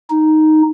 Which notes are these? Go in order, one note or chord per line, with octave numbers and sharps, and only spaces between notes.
D#4